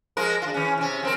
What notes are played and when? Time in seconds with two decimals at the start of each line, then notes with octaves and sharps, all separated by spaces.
0.17 F3 G#3 A#4
0.42 D4 F4
0.54 E3 C#4
0.78 C3 C#4
1.03 F3 C4 A#4